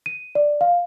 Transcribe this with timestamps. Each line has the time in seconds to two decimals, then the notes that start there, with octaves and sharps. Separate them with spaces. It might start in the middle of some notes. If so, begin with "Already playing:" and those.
0.06 D#7
0.35 D5
0.61 F5